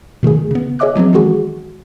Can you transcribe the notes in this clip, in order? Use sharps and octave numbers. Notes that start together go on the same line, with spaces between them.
B2 D#3 A3 G#4
C#3 B3
G#4 C#5 D#5 E5 D6 F#6
F3 F#3 B3 C4
D#3 E3 G#3 F#4 G#4